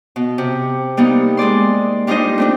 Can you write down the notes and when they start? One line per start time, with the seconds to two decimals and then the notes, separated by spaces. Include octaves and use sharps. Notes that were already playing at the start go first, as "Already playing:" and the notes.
0.16 B2
0.38 C3
0.97 G3 A#3 B3 D#4
1.37 G#3 G#4 D5 C6
2.07 G3 D4 D#4 F4 C5 D#5
2.38 A3 C4 D4